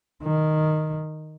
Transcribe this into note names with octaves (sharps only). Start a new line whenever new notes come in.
D#3